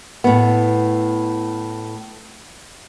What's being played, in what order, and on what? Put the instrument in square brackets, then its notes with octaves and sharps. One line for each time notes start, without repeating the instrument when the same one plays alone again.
[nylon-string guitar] A2 B3